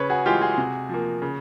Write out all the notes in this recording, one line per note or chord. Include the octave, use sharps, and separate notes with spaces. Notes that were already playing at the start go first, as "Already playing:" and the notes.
Already playing: C#3 B4 C#5
F#4 G#4
E3 G#3 F4 G4
F#4 G#4
C3
F3 A#3
C#3